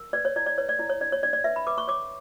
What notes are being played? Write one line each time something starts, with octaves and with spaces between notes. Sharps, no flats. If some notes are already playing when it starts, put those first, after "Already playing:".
Already playing: A#4
B4 D5
C#5
E4 D5
D5
B4 C#5
D5
E4 D5
C#5
D4 D5
C#5
D4 D5
D5
B4 E5
B5
B4 D6
C#6
C#5 D6